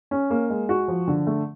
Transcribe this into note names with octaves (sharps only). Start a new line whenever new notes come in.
C#4
A#3
G#3
F#4
F3
D3
A3